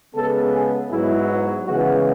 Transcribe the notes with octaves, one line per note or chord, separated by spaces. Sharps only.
C#3 G#3 B3 A4
G#4
G#2 F#3 B3 E4
C#3 E3 G#3 B3 F#4